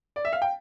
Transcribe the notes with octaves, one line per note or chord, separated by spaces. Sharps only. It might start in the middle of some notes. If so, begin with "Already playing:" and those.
D5
E5
F5
G5